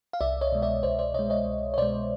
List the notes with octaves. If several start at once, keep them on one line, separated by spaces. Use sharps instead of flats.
F5
C2 D5 E5
C#5 D#5
B2 G#3
D5 E5
C2 C5 D5
C5 D5
B2 G#3 C#5 D#5
C#5 D#5
C2
C#5
B2 G#3 C5 D5